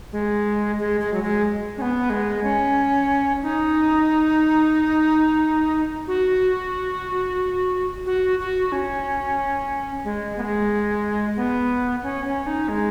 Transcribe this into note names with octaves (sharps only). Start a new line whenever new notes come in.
G#3
G#3
G#3
F#3
G#3
C#4
B3
G#3
C#4
D#4
F#4
F#4
F#4
C#4
G#3
B3
G#3
B3
C#4
C#4
D#4
G#3